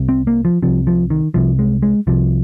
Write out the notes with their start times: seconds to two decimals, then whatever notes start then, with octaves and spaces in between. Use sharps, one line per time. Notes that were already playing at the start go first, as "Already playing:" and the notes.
Already playing: C2 C3
0.09 C4
0.27 A#3
0.45 F3
0.62 C2 C3 F3
0.87 F3
1.10 D#3
1.34 C2 C3 F3
1.59 G#3
1.82 G#3
2.07 C2 C3 F3